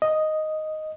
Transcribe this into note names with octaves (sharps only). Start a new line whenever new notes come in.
D#5